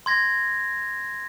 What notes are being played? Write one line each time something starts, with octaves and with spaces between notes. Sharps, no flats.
C6 G#6 A#6